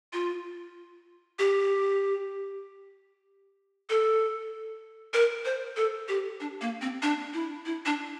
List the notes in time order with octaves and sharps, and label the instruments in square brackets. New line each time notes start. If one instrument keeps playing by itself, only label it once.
[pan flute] F4
G4
A4
A#4
C5
A4
G4
D4
A#3
C4
D4
E4
E4
D4